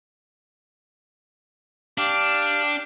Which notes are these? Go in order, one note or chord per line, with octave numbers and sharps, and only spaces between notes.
D4 G4 F5